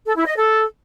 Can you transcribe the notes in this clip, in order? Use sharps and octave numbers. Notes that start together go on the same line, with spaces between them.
A4
E4
D#5
A4